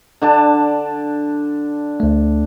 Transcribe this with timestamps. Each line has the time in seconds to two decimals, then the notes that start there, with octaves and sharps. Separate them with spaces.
0.22 D3 D4 A5
2.00 D2 A3